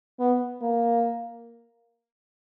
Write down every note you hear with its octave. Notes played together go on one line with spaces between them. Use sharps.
B3
A#3